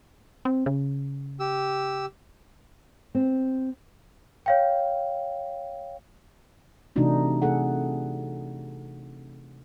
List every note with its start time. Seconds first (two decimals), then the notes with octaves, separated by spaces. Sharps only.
0.45 C4
0.66 C#3
1.40 G4 E6
3.15 C4
4.46 C#5 F5 G5
6.96 C3 E3 A3 D4 D#4 F#4
7.42 C3 A3 C4 G#4 A4 F#5